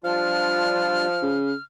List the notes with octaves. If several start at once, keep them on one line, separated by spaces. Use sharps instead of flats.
F3 G3 D4 F4 F6
C#3